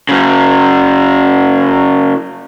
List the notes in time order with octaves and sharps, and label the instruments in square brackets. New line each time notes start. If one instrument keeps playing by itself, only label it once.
[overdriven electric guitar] C#3 F#3